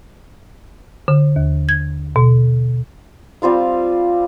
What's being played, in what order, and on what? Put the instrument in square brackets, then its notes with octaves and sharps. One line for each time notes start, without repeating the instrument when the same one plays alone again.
[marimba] D3
D#2
G#6
B2
[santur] G3 C4 F4 F5